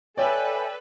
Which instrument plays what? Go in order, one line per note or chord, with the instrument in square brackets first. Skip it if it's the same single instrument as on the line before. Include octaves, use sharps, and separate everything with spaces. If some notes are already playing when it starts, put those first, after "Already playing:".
[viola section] A4 B4 [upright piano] C#5 [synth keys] D5 G5 E6 [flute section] E5 G#5